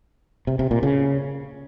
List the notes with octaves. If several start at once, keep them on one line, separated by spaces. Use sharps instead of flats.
C3
C3
A#2
C#3